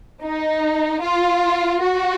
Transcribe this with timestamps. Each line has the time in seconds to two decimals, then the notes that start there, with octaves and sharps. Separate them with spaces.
0.23 D#4
1.02 F4
1.81 F#4